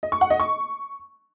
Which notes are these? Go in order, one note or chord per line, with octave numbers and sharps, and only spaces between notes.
D#5
C#6
F#5
D#5
C#6